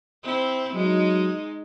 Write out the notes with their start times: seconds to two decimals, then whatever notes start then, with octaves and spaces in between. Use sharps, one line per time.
0.23 C4 E4
0.74 F#3 G#3 D#4